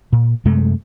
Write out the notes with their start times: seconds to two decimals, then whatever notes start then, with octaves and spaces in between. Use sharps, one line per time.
0.13 A#2
0.45 F#2 C3 G#3 A3